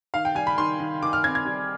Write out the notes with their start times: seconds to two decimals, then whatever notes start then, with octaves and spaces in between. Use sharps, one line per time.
0.14 D#3 F5
0.25 G5
0.35 G3 G#5
0.47 B5
0.58 D#3 C6
0.80 D#3
1.02 D#3 D6
1.13 F6
1.24 C4 G#6
1.35 G#6
1.45 G3